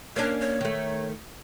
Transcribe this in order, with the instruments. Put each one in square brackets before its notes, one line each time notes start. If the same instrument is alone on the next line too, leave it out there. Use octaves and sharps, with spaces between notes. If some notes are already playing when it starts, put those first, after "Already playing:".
[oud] A#3 C#4 D4 [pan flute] C#5
[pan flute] C#5
[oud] D#3 A3